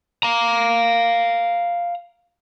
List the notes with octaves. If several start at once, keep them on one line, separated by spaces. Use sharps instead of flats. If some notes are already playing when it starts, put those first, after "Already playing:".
F5 A#5